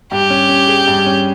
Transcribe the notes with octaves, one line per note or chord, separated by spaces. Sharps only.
G2 G4
C#4
C#4
G#4
G2
C#4